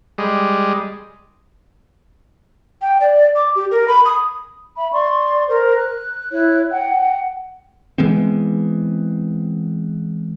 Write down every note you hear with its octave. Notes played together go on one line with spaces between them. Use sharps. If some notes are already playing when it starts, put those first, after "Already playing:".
G3 G#3
G5
D5
D6
G4
A#4
B5
D#6
E5 B5
D5 C6 C#6
A#4 C5
F#6
E4 C#5 F#6
F#5 G5
E3 G#3 B3 C4